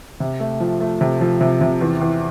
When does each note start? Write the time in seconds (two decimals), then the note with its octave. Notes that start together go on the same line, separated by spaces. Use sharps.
0.20 C3
0.40 A3
0.60 F3
0.81 A3
1.01 C3
1.21 F3
1.41 C3
1.61 C3
1.81 E2
2.01 E2